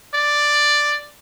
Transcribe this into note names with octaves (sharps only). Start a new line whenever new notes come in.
D5